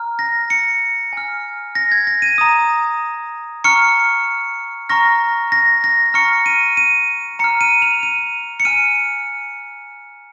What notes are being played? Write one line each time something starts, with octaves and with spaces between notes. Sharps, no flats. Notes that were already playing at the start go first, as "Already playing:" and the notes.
Already playing: A#5 F6
A#6
C#7
G#5 F6
A#6
G#6
A#6
D#7
A#5 D#6
A#5 C#6 F6 C#7
A#5 C#6 F6 A#6
A#6
A#6
A#5 C#6 F6 C#7
D#7
D#7
A#5 F6 C#7
D#7
F7
D#7
C#7
G#5 F6 D#7